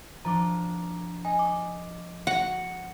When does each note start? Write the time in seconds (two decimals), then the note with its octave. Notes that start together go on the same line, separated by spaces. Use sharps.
0.25 F3 D4 A#5 D6
1.25 D#5 G#5
1.39 D6
2.27 F#4 F#5